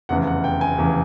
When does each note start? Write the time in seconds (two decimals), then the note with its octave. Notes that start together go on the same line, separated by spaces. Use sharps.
0.09 F1 E2 C#3 F#5
0.27 F#5
0.44 G5
0.61 G#5
0.78 F1 E2 C#3